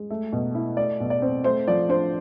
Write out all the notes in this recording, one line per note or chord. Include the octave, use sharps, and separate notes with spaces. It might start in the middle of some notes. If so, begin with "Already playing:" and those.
Already playing: G#3
A3
B2
E4
A3 D5
B2
D5
C4
A3 C5
F3 D5
D4 C5